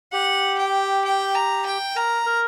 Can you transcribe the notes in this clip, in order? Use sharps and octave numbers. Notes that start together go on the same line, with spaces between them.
G4 F#5
G5
G5
A#5
G5
A#4 A#5
A#4